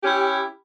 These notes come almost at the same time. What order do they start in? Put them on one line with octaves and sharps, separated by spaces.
G4 C#4 E4